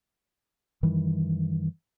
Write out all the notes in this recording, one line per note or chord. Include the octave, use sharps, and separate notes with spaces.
F#2 D#3 E3 G3